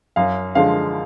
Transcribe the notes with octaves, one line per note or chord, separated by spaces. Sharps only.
F#2 F5
D3 F3 G#3 F5